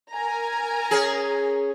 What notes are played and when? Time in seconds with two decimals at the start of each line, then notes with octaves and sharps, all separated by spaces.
0.11 A#4 G#5 A#5
0.91 C#4 G#4